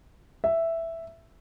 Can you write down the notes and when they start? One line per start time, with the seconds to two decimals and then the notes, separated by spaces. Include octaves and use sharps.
0.44 E5